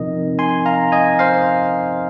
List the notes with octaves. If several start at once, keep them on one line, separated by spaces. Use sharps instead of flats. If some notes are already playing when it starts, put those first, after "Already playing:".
Already playing: C3 F3 C4 D#4 A#4 D#5
G#5 C6
F5 A#5
D#5 G#5
C5 F5